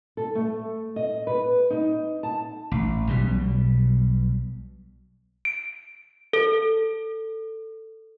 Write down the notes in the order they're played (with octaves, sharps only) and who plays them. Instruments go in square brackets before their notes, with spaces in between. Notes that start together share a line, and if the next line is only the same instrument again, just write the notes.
[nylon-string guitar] A4
A3
D#5
B4
D#4
A5
[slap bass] A1
B1 B2 D3 G3
[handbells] D7
A4